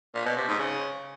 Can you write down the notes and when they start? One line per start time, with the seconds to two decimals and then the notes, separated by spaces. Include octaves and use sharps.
0.15 A#2
0.26 B2
0.37 C3
0.48 G#2
0.59 C#3